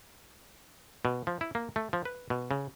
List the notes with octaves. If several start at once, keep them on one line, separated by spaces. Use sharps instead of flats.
B2
F3
E4
A#3
A3
F3
B4
B2
C#3